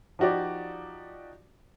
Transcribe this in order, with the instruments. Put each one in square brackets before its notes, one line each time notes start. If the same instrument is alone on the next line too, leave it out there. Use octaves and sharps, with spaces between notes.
[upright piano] F3 D#4 F#4 G4 D5